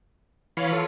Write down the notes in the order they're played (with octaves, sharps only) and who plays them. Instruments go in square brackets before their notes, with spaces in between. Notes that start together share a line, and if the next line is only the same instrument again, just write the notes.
[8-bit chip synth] E3 [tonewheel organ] C#5 F5 B5
[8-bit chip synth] F4 [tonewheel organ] A4